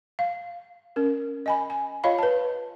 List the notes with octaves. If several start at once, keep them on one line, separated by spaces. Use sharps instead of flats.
F5
C#4 A#4
D#5 G#5 B5
G#5
F4 C#5 D#5 F5 B5
B4 A5